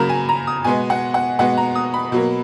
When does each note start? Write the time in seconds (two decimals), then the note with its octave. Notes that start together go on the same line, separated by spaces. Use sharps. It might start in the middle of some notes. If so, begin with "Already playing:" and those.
Already playing: C#3 F#3 A#3 A#5 B5
0.09 G#5
0.29 A#5
0.47 D#6
0.64 B2 G#3 B3 G#5
0.90 F#5
1.14 F#5
1.39 B2 G#3 B3 F#5
1.57 A#5
1.75 D#6
1.94 B5
2.12 B2 F#3 A#3